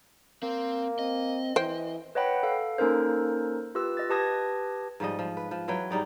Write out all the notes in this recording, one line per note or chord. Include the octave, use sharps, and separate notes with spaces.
A#3 C4
C4 D#5
E3 C5 G5
B4 C#5 D#5 F#5 G5 B5
A4 F5
A#3 C#4 D#4 A4 A#4 C5
F4 G4 B4 E6
D#5 A6
G4 B4 A5 D#6 G#6 A#6
G#2 F3 G3 D#5
F3
B4
F3
E3 F#3 B4 G5
G#2 G3 D#4 D5